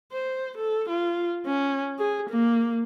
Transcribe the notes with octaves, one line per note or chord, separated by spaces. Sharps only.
C5
A4
F4
C#4
G#4
A#3